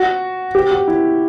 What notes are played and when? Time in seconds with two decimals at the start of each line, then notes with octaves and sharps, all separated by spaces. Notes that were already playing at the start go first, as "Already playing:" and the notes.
Already playing: F#4
0.55 G4
0.71 F#4
0.88 E4